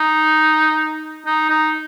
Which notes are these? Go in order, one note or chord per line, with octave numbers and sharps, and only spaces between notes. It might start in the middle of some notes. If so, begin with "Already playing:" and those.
Already playing: D#4
D#4
D#4